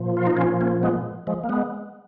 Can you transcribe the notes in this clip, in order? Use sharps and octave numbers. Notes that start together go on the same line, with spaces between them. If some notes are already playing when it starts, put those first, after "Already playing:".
Already playing: A#2 F3
F4
D#4
C#4 F4
A#3 C#4
G#3 B3
F3 G#3
A#3
G#3 B3